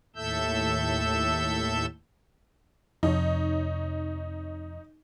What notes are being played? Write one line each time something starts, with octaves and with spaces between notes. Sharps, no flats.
D#2 A2 A4 E5 E6 G6
F2 C3 D#4 C#5